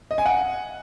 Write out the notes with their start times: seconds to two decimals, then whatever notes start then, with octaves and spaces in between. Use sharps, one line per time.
0.11 D#5
0.18 G#5
0.26 F#5